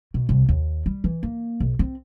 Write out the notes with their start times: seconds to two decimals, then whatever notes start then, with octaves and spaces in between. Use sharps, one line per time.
0.14 B2
0.29 C2
0.49 D#2
0.86 G3
1.04 E3
1.23 A#3
1.60 B1
1.79 C4